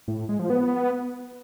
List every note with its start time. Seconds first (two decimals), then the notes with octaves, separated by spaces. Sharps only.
0.08 A2
0.18 A2
0.29 G#3
0.39 F3
0.50 B3